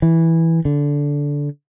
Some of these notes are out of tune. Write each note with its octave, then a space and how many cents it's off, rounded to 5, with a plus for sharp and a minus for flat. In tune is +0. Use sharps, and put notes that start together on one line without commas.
E3 -5
D3 -15